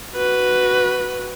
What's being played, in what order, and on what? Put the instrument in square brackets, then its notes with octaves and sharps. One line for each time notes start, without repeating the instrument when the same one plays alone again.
[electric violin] F#4 B4